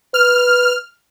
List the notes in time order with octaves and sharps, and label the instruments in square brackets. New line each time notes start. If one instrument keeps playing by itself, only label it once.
[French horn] B4 [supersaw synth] F6